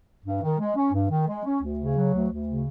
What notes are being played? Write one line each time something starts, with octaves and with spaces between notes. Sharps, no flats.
G2
D#3
G#3
C#4
G2
D#3
G#3
C#4
D2
C#3
F#3
D2
D2
C#3